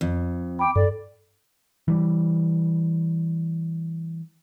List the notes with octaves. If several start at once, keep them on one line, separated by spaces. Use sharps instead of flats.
F2
G5 B5 D6
G2 A4 D5
E3 G3